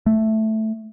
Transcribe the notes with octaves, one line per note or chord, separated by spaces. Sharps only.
A3